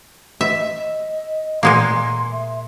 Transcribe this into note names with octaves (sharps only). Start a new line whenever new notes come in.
D#5 E5
D#5
A#2 G#3 A#3 C6
E5